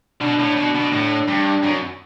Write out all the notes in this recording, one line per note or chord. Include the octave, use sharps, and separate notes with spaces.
B2 D4
A2
B2
B2
A2
G2
F#2